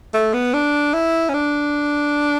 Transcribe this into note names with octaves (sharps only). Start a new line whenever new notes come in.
A3
B3
D4
E4
C#4
D4